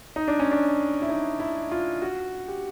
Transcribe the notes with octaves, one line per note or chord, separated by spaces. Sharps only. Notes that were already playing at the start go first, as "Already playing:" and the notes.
D#4
D4
C#4
D4
E4
D#4
E4
F4
F#4
G4